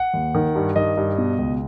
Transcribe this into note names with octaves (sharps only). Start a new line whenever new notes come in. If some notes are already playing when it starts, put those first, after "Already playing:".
Already playing: F#5
D#2
D#3
G2
D#3 D#5
G2
B2
C#2